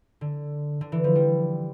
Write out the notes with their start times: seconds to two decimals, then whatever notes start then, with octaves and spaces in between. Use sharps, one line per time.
0.21 D3
0.81 D3
0.92 E3
1.04 F3
1.15 G3